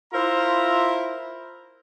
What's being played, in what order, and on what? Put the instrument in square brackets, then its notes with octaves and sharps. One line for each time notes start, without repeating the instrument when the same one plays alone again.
[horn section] E4 F4 A#4 C5 E5 A#5